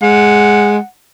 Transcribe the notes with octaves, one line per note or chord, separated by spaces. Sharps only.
G#3 F#5